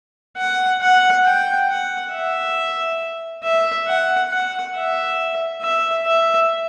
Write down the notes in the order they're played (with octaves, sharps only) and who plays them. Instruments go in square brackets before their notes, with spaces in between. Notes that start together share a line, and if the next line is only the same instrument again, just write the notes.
[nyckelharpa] F#5
F#5
G5
F#5
E5
E5
F#5
F#5
E5
E5
E5